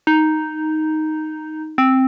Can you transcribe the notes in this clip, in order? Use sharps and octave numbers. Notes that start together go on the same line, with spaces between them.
D#4
C4